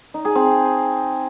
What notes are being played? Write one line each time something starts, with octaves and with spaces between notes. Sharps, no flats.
D#4
G#4
C4